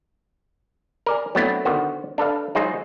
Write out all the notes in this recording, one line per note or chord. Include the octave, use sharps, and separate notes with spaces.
A#4 D5 G#5
F#3 A3 B3 C4 D4 E4
D3 D#3 B3 F#4 C5
D4 A4 B4 F5
F#3 G#3 D#4 F4 G#4 C5